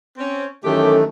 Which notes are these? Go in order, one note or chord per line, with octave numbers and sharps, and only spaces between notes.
C4 C#4
F#2 D#3 E3 A3 C#4 G4 A4